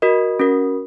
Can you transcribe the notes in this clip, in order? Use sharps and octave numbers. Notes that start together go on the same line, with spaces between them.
F#4 A#4 D#5
C#4 F#4 A#4